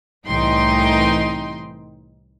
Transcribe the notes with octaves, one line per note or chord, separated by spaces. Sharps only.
C2 A2 E3 D#4 G5 C6